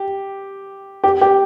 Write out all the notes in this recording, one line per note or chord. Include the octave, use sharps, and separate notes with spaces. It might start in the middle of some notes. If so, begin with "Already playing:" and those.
Already playing: G4
G4
G4